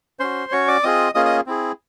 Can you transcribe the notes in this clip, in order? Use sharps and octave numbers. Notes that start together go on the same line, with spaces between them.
C#4 F#4 C5 C6
C#4 F#4 C#5 C#6
D5 D6
C4 F4 G#4 D#5 D#6
A#3 C#4 F4 G#4 D#5 D#6
D#5 D#6
C4 E4 G#4